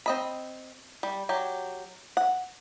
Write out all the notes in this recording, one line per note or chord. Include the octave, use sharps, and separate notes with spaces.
C4 D#5 B5
G3
F#3 G4
F#5